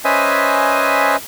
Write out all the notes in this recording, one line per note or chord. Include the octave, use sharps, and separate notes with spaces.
C#4 B4 C5 D#5 E5 G#5